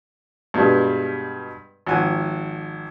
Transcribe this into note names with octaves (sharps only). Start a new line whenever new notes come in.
G2 B2 G3 G#3
G#1 F3 F#5 G#5